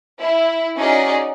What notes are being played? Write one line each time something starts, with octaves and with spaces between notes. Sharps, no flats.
E4
C#4 D#4 F#4 G#4 D5 D#5